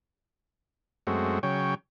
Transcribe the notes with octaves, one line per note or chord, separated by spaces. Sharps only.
F#2 G#3 A3 C4 F#4
C#3 F#3 C#5 G5